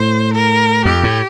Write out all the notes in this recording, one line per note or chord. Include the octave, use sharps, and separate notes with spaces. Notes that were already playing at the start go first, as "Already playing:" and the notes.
Already playing: A2 C5
A#4
F2 G4
A2